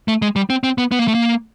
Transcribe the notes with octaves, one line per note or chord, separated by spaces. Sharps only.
A3
G#3
G3
C4
C4
B3
B3
A#3
A3
A#3